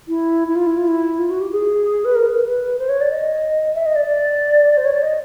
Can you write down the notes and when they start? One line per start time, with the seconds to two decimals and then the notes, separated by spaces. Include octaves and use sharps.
0.08 E4
0.48 E4
0.55 F4
0.67 E4
0.77 F4
0.88 E4
1.19 F4
1.30 F#4
1.41 G4
1.52 G#4
2.05 B4
2.15 A#4
2.31 B4
2.47 B4
2.79 C5
2.89 C#5
3.01 D5
3.11 D#5
3.75 E5
3.86 D#5
3.96 D5
4.06 D5
4.77 C5
4.85 C#5
4.94 D5
5.02 D#5